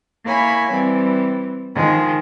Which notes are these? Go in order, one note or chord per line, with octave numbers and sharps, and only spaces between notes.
A#3 E4 C#5 G#5 B5
E3 G3 C4
D#3 F3 G#3